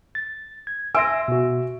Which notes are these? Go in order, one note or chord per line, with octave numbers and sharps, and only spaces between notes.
A6
G#6
E5 G#5 C6 E6 A#6 D7
B2 F#4